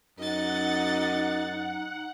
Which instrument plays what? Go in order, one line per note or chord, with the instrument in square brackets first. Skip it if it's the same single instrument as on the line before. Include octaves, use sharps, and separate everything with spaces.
[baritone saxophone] F#2 [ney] D#4 [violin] D#5 A6 [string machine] F#5